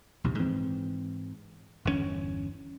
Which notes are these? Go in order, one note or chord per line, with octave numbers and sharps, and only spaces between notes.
A#1 D#2 C3
G#2 E3 C4
G1 E2 A#2 C#4